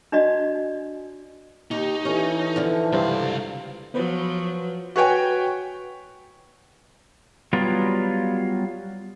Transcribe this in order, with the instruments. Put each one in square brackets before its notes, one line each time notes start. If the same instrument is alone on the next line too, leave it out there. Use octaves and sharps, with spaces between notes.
[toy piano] D4 F#4 D5 D#5
[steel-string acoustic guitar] D#2 G4 [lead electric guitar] D#4
[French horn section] E3 A4 [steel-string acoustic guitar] C#4
[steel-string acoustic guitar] D3 F3
[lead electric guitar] C#2 F5 [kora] G2 C3 C4
[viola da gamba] F3 F#3 [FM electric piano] B3 B4 C5
[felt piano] F#4 B4 C#5 G5 G#5
[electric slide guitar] F#3 G3 B3 F4